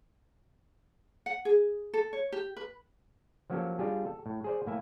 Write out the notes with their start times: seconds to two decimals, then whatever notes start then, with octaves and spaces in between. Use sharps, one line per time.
1.26 F#5
1.45 G#4
1.94 A4
2.13 C#5
2.32 G4
2.56 B4
3.50 F3 F#3 A#3 C#4 G4 A4
3.79 G3 D4 F4 G4 G#4
4.06 A4
4.26 A2
4.44 G#4 C5 D5
4.67 A2 A#3 E4 E5 G#5